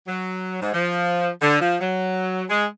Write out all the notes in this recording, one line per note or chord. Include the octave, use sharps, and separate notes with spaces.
F#3
G#2
F3
D3
F3
F#3
G#3